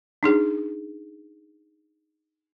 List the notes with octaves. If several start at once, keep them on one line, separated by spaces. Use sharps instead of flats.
D4 D#4 G#4